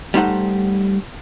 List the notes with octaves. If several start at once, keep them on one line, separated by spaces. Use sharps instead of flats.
G3 A3 D#4 C5 F#5